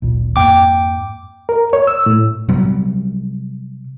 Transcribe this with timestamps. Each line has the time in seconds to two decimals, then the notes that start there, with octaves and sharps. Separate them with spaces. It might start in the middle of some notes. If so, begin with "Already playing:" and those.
0.02 D1 G#1 A#2
0.36 F2 G#2 A#3 G5 D6
1.49 A#4
1.73 C#5
1.87 E6
2.06 A2
2.49 C3 F#3 G3